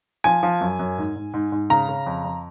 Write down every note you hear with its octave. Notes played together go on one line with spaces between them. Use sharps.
F3 G#5
F3
F#2
F#2
G#2
G#2
G#2
G#2
C#3 A#5
C#3
F2
F2